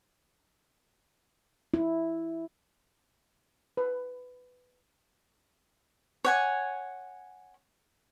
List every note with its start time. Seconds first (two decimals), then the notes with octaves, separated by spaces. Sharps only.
1.74 E4
3.77 B4
6.25 C#5 F#5 G#5